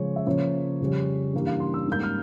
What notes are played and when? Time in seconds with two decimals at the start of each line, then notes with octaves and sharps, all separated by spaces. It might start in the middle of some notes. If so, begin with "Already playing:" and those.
Already playing: C#3 F3 G#3 C#4 C#5
0.16 E5
0.26 C#3 F3 A#3 C#5
0.80 F2 C#3 G3 C#4
1.34 G2 E3 G3 A#3
1.47 F5
1.60 C6
1.74 E6
1.87 G#2 G3 A#3 G6
2.03 F6